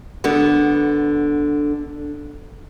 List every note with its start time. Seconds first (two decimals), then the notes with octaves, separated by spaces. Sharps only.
0.24 D3 B3